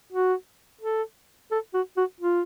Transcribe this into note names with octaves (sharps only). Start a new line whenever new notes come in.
F#4
A4
A4
F#4
F#4
F4